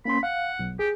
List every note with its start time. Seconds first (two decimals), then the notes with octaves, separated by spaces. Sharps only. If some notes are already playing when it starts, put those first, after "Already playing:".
0.05 A#3 C#4 B5 C6
0.23 F5 F#5
0.59 B1
0.79 G4 G#4